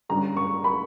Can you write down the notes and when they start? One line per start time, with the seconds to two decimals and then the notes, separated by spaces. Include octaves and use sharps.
0.09 G2 D3 G3 C#4 A#5
0.37 C#6
0.64 B5